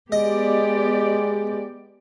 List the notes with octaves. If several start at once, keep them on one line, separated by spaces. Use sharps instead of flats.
G#3 B3 G4 D5 D#5